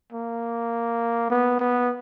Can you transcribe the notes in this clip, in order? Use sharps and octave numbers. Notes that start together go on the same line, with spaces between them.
A#3
B3
B3